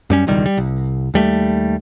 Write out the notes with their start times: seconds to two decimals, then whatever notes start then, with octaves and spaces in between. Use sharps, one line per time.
0.10 F#2 G3 C#4
0.27 E1 C#2 D#3 G3
0.46 G3
0.57 C2
1.14 D#2 G3 A3